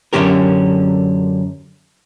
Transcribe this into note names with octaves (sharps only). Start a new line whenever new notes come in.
F#2 A#2 D3 C#4 G4 A#4